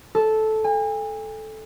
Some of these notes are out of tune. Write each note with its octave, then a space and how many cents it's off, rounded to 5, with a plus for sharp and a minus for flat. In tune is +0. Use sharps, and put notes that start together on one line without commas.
A4 -10
G#5 -40